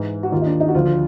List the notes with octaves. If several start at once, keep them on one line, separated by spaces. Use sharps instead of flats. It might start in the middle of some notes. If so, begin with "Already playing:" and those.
Already playing: G#2 E3
F#4
D#2 D#3 F4
D#4
D4
D#4
F#4
D2 D3 F3 F4
F4